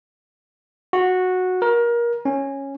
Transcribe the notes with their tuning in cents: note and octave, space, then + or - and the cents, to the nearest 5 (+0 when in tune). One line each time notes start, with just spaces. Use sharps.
F#4 -10
A#4 +25
C#4 -10